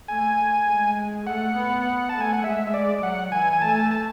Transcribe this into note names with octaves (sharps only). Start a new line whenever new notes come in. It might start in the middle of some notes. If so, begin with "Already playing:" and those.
A3 G#5
G#3
A3 F#5
B3
A5
A3
G#5
F#5
G#3 E5
E5
D5
F#3 F#5
E3 G#5
G#5
A3 A5
G#5
A5
A5